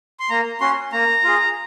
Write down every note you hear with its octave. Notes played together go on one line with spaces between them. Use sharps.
C6
A#3 A#5
C#4 F#4 C6
A#3 A#5
F4 G#4